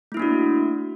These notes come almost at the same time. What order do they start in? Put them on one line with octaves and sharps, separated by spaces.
A3 E4 A#3 D4 F#4